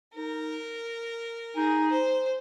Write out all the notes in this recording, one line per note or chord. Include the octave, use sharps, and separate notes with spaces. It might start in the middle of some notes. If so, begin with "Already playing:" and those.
D#4 A#4
D#4 G#4
C5